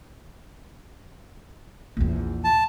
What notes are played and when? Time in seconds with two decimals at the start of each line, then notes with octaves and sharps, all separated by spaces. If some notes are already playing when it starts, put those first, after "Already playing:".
1.97 A#1 E2
2.44 A5